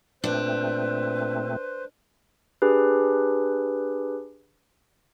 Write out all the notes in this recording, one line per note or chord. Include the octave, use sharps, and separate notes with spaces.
A#2 A3 C4 D4 B4 C5
D4 G4 G#4 B4